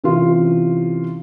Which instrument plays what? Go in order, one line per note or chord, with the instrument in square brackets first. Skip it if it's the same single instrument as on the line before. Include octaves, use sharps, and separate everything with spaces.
[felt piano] C3 E3 C#4 F4